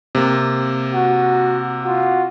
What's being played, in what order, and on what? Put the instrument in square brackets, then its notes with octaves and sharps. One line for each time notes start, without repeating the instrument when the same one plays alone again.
[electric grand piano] C3 A#3
[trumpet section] F#4
F4 F#4